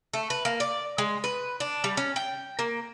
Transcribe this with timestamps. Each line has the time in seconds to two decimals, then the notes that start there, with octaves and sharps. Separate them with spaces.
0.13 A3
0.30 B4
0.45 A#3
0.60 D5
0.98 G#3
1.24 B4
1.60 D4
1.84 G3
1.97 C#4
2.16 G5
2.59 A#3